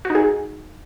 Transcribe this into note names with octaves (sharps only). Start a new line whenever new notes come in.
F#4
D#4
G#4